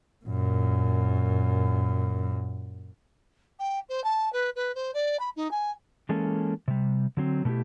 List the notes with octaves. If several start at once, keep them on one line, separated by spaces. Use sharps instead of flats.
F#2 A#2
G5
C5
A5
B4
B4
C5
D5
B5
D#4
G#5
E3 G#3 A#3 C#4 A4
C3 G3
D3 F#3 C4
B2 A3 D#4 E4 G4